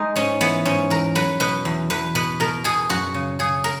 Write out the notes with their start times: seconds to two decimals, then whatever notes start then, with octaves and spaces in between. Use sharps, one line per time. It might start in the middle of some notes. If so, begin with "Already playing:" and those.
Already playing: G#3 D#4
0.16 G#2 C#4
0.41 E3 B3
0.65 G#2 C#4
0.90 E2 A#4
1.15 F#3 B4
1.40 B2 B4
1.65 E2
1.90 E2 B4
2.15 B2 B4
2.40 B2 A#4
2.64 B2 G#4
2.89 F#2 F#4
3.14 C#3
3.39 C#3 G#4
3.64 A#4